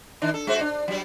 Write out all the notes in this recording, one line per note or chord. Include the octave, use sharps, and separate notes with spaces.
D#3 D4
A4
G#3 F#4 C5
D4
F#3 G3